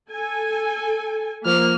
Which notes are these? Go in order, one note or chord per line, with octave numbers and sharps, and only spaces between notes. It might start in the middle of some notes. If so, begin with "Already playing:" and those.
A4 G#5
F3 A#3 F6